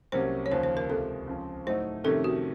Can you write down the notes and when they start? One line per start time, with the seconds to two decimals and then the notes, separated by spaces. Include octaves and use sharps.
0.12 C2 C3 F#3 A#3 C#4 C5
0.46 C#5
0.51 D#2 C#3 F3 C5
0.63 C5
0.77 A#4
0.89 C#2 C3 F3 A4
1.27 C#2 C#3 F3 C4
1.66 A2 F#3 A3 D#4 C5
2.04 F2 C3 D#3 A3 C#4 A4
2.24 F#4